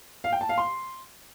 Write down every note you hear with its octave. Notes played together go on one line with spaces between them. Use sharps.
F5
G5
A5
F5
C6